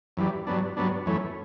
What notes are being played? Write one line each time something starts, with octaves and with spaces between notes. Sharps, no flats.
F#2 E3 G3
G2 F#3 B3 D4
G2 F#3 B3 D4
F#2 E3 A3 C#4